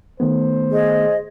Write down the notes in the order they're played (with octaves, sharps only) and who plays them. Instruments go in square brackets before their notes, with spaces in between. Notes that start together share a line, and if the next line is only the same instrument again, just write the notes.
[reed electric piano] D#3 A3 B3 [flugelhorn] C5
[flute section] G#4 D#5